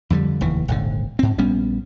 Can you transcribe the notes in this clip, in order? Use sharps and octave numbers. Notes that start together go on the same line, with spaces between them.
F2 D3 F#3 G3
F1 D#2 E3
D#1 G#1 D3
G#2 C4
A#1 G3 B3 C#4